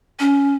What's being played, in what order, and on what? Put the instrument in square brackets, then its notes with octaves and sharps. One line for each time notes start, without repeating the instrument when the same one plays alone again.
[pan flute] C#4